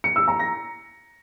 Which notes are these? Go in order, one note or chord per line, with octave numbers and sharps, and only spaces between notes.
C#7
E6
A#5
A#6